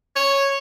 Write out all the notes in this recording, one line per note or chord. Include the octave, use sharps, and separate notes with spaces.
C#5